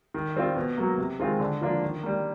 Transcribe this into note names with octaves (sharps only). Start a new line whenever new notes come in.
D#3
G3 C4 F4
B2
F#3 A#3
C3
D#3 G#3 C4 F4
D3
F3 A#3 D4 F4
D#3
G3 A#3